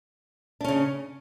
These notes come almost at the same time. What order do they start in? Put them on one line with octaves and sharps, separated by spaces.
D4 C#4 C#3